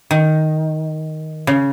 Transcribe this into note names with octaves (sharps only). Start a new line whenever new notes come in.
D#3
C#3